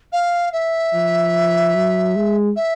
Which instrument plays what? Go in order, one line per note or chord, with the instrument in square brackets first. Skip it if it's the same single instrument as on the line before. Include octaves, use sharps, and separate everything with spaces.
[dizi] F5
E5
[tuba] F3
F#3
G#3
[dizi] E5